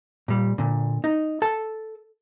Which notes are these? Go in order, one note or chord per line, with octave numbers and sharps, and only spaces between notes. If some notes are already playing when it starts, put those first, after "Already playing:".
A#2 G3
A#2 D3
D#4
A4 A5